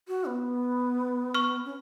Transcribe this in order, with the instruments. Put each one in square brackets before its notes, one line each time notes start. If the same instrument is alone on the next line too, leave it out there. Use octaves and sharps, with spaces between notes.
[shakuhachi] F#4
B3
[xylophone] C#6 F6
[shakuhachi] C#4